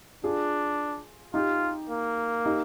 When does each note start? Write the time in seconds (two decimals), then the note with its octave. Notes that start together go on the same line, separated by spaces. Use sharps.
0.24 D4 F4 G#4
1.34 D#4 F4 G4
1.90 A#3
2.44 D#4 G4